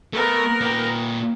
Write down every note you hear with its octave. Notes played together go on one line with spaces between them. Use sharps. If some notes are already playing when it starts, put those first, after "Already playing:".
A3 B3 A#4
A#2 G5